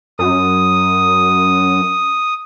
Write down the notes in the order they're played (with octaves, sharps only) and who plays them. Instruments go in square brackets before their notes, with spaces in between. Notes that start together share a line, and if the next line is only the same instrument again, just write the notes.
[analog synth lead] F#2 [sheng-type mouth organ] D#6